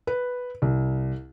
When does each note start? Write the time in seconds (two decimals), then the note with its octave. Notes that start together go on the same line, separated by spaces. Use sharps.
0.07 B4
0.62 C2